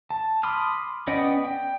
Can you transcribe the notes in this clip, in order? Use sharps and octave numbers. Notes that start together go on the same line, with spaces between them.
A5
B5 C6 D6 D#6 F6
B3 C#4 D5 D#5 G5
G5